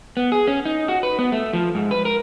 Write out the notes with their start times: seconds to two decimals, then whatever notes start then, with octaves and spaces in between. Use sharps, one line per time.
0.17 B3
0.32 G#4
0.47 C#4
0.65 D#4
0.88 F#4
1.03 B4
1.19 B3
1.32 A3
1.53 F3
1.75 G#2
1.91 B4
2.05 A#4